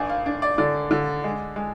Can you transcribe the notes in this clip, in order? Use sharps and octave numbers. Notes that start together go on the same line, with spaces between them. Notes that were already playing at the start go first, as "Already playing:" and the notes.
Already playing: G#1 D4 G#5
F5
D4
D5
D3 D5
D3
G#3
G#3